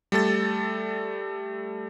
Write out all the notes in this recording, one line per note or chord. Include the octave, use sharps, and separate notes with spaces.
G3 A3 A4 A6